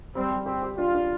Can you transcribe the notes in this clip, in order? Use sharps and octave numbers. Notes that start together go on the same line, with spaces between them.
G3 C4
G3
C4 G4
G4
D4 F4
D4